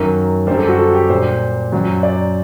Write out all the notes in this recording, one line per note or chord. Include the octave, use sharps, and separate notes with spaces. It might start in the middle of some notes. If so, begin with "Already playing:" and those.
Already playing: F#2 D#3 F#3 A#4
F#2 D3 G3 C5
A4
F#4
A4
G4
A#2 G3 C5
F#2 F#3
D5